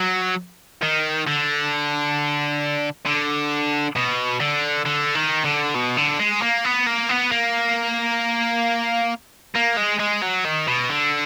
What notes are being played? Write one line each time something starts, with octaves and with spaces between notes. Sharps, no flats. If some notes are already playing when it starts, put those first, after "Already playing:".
Already playing: F#3
D#3
D3
D3
B2
D3
D3
D#3
D3
B2
D3
G#3
A#3
B3
A#3
B3
A#3
A#3
G#3
G#3
F#3
D#3
B2
D3